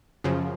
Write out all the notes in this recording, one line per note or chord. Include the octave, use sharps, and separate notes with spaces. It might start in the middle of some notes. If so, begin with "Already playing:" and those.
F#2 C#3 F3